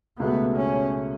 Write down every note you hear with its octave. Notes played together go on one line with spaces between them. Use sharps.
C#2 B2 A3 B3
C#4